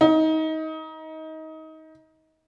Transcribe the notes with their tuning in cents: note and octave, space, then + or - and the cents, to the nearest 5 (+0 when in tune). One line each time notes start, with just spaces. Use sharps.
D#4 +25